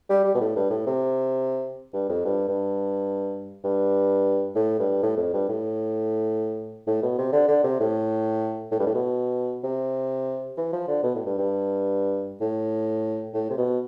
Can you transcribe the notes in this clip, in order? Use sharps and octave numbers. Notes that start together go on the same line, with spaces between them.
G3
G3
B2
A2
G2
A2
C3
G2
F2
G2
G2
G2
A2
G2
A2
F2
G2
A2
A2
B2
C3
D3
D3
C3
A2
A2
G2
A2
B2
C3
E3
F3
D3
B2
A2
G2
G2
A2
A2
C3
B2